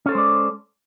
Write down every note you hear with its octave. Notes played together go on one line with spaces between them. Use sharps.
G#3 C#4 A4 C5 D5